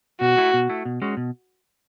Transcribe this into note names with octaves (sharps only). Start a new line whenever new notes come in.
B2 F#4
A3 E4
B2
A3 E4
B2
G#3 C#4 F#4
B2